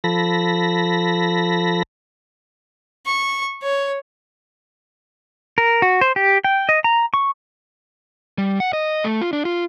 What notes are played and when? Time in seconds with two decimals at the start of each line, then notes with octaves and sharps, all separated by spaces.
0.04 F3 A4 B5 A#6
3.06 C#6
3.63 C#5
5.58 A#4
5.82 F#4
6.01 C5
6.16 G4
6.44 G5
6.69 D#5
6.84 A#5
7.14 C#6
8.38 G3
8.60 F#5
8.73 D#5
9.04 A3
9.22 F4
9.33 D4
9.45 F4